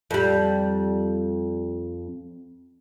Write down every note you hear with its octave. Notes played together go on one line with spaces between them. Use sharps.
F2 G3